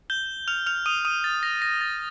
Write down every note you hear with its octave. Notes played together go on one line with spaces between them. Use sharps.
G6 G7
F6 F7
F6 F7
D#6 D#7
D#6 D#7
A6
A#6
A#6
A6